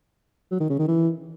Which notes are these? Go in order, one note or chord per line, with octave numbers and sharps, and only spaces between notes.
F#3
D#3
C#3
D#3
E3